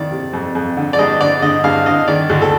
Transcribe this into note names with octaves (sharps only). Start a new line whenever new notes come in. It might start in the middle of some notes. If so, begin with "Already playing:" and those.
Already playing: F2 D#3 D5
C3
F2
F2
D3
D5
G2 D#5
D3 D5
D3 D#5
G2 F5
D3 D#5
D#3 D5
D2
A4